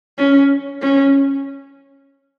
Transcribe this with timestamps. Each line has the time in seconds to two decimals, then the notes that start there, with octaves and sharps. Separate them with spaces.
0.18 C#4
0.82 C#4